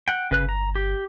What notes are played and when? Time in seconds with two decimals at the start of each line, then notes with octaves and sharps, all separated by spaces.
0.08 F#5 G5
0.31 G1 C#3 B4 F#6
0.49 A#5
0.75 G4